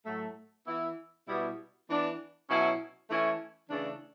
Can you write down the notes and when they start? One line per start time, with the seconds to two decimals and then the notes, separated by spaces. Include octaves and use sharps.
0.06 A2 F#3 A3
0.67 E3 B3 E4
1.27 B2 G3 B3 E4
1.88 E3 B3 D4
2.49 B2 F#3 C#4 E4
3.09 E3 A3 C#4 E4
3.69 C#3 E3 A3 D4